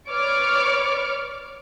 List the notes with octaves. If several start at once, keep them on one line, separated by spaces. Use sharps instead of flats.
B4 C#5 D5 C#6 D6 F6